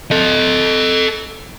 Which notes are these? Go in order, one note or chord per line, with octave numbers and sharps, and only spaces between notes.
A4 D#5